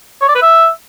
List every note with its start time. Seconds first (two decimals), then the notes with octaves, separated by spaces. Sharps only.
0.21 C#5
0.28 D5
0.35 B4
0.42 E5